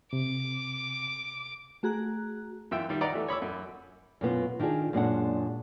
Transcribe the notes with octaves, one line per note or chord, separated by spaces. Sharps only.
C3 D6
A3 F#4 G#4 A#5 F#6
F#2 E3 F4 E5 G5 E6
D#3 G3
B4 D5 D#5 F#5 G5 A#5
E3 A3
C#5 B5 D6 E6
F#2
F#2 B2 B3 F4
D#3 D4 E4 F4 G#4
F#2 A#2 G3 G#3 D4 F#5